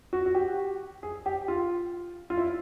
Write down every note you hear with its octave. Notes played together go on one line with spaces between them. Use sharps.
F#4
F#4
G4
G#4
G4
F4
F4
E4